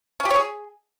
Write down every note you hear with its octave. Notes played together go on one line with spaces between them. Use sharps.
C#4
G4
C#5
G#4